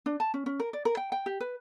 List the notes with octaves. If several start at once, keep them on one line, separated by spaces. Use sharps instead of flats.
D4
A5
C#4
C#4
A#4
D5
A#4
G5
G5
G4
B4